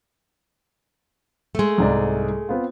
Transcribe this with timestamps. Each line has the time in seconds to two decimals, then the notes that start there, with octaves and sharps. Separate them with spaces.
1.55 G#3 A3
1.78 C2 G#2 D5
2.49 B3 C4 F4